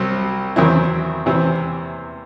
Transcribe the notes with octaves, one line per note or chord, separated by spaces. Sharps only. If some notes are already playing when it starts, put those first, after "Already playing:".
Already playing: C2 C3 F#3 C4
E2 D#3 F#3 C4 E4
E2 C3 E3 C4